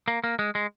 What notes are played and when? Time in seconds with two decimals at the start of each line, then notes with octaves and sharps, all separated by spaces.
0.08 A#3
0.24 A#3
0.39 G#3
0.55 G#3